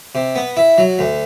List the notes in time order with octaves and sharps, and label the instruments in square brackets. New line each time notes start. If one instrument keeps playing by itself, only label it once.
[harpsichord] C3
B3
E4
F#3
D2